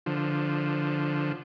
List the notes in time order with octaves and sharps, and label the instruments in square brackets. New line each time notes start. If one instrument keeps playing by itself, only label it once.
[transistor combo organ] D3 F3